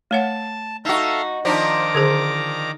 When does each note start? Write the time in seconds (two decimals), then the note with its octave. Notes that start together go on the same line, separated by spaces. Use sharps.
0.11 A3 C#5 F#5 A5
0.85 D#4 F#4 A4 E5 F5
1.45 D#3 F3 D4 D#4 A#5 D6
1.95 D3 G#4 C5